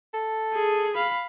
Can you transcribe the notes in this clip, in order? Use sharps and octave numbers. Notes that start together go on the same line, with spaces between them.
A4
G#4
F5 B5